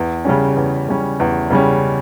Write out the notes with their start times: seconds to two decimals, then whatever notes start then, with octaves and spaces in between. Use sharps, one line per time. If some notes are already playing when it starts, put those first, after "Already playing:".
Already playing: E2
0.25 C#3 G3 C#4
0.56 E2
0.89 C#3 G3 C#4
1.20 E2
1.51 C#3 G3 C#4